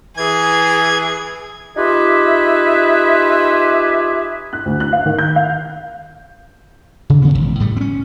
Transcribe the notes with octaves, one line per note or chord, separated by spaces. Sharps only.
E3 G#4 G#6
D#4 F4 G4 G#4 B4 E5
F#6
D2
F#6
F5
D#3
G6
F5
C#3
C3 F3 B3 C#4
E1 A1 F#2
A2 G3 A3
C4 C#4